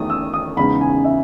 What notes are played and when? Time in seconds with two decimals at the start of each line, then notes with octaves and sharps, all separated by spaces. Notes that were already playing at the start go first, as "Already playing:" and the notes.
Already playing: E2 D#3 A3 D#4 D#6
0.10 E6
0.34 D#6
0.57 E2 C#3 G#3 D#4 B5
0.81 G#5
1.05 E5